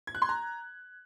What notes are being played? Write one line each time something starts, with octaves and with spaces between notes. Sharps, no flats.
G#6
F#6
C6
A#5